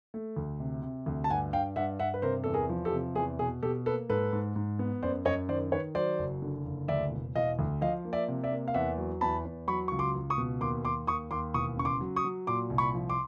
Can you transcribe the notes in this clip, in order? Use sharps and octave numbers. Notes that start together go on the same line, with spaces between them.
A3
D2
C3
C3
D2
A5
G2 F#5 G#5
G2 F5 G5
G2 E5 F#5
G2 E5 F#5
B4
C3 A#4 C5
E2 A4
G#4 A#4
F3
G4 A4
C3
E2 G#4
B2 G#4
B2 G4 A4
A#3 A4 B4
G#2 A4 B4
G#2
G#2
B3
F#2 C5 D5
F#2 C#5 D#5
D#3 C5 D5
D#3 B4 C#5
F#3 C5 D5
F#1
D3
F#1
D2 D5 E5
E1
E1 D#5 F5
D2
F3 D#5 F5
A#3
D5 E5
C3
D5 E5
A#3
F5
E2 E5 F#5
F#3
E2 A5 B5
E2
F#3 B5 C#6
C#2 C#6
C6 D6
C#2
C#6 D#6
B2
D#2 C6 D6
D#2 C6 D6
D#2 C#6 D#6
D#2 C6 D6
E1 C#6 D#6
C#3 C#6
C6 D6
F#3
C#6 D#6
F#3
A#2 C6 D6
C2
B5 C#6
F3
C6 D6